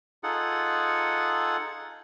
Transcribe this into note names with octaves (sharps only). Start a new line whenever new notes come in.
D#4 F4 G#4 A4 F#5